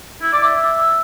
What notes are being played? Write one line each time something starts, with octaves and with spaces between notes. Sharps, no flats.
E4
D5
E5